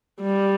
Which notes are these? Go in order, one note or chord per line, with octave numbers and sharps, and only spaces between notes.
G3